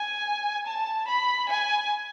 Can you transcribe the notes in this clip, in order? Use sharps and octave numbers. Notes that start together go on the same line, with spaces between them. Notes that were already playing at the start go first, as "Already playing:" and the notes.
Already playing: G#5
A5
B5
G#5